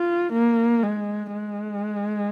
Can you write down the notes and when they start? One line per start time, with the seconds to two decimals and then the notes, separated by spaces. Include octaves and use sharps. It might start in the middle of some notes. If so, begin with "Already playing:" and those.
Already playing: F4
0.33 A#3
0.83 G#3
1.33 G#3